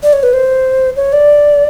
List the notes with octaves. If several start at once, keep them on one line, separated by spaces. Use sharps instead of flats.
D5
C#5
B4
C5
C#5
D5